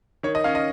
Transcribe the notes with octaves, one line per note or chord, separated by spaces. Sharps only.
D#3 C#5
D#5
C#4 F5
D#5